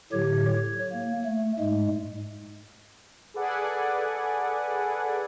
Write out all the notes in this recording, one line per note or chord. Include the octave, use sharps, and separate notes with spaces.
A2 D3 F#3 G4 C#5
C#5
A#3
A3
G#2 G#3
G#4 A4 B4 D5 F#5 G#5